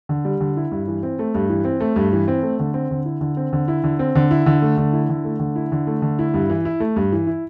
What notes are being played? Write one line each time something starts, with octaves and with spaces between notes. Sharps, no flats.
D3
G3
D3
E4
G2
E3
C4
A3
G2
E3
C4
A3
G2
E3
C4
A3
D3
C4
D3
E4
D3
C4
D3
E4
D3
C4
D3
E4
D3
A3
D3
E4
D3
A3
D3
E4
D3
A3
D3
E4
G2
E3
E4
A3
G2
E3
E4